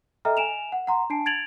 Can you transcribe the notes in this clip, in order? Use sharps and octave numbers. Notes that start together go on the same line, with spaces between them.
A4 D#5 E5 G5 A#5 F6
G#5 D7 E7 F7
F#5
F#5 A#5 C6
D4 G#5 A5 C7 D7
G#6 A6 D7 F7 F#7